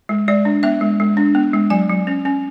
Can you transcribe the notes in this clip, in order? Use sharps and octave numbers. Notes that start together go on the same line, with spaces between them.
G#3
G#3 D5
D4
B3 E5
G#3
G#3
D4
B3
G#3
F#3 G#5
F#3
C#4
C#4